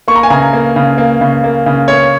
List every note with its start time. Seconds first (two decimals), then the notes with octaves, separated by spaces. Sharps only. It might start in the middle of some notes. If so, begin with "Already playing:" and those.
0.08 A#3 C#6
0.16 A#5
0.23 G#5
0.30 C#3 A#5
0.53 A#3
0.76 C#3
0.98 A#3
1.21 C#3
1.44 A#3
1.66 C#3
1.88 A#3 C#5